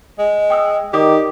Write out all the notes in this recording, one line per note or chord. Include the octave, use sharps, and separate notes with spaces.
G#3
G5 D#6 E6
D#3 G4 D5 D6 D#6